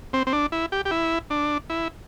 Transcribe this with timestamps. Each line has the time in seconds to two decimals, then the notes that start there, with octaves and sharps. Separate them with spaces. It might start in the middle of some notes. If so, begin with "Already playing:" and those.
0.13 C4
0.27 C4
0.33 D4
0.52 E4
0.72 G4
0.85 G4
0.91 E4
1.30 D4
1.70 E4